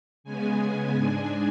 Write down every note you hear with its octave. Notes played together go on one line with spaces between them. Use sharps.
C#3 G#3 B3 G#5
G#2 G#3 D4